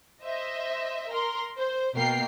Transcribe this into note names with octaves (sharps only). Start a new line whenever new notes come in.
C5 D#5 E5
A#4 C6
C5
B2 A#3 A#4 G5 C7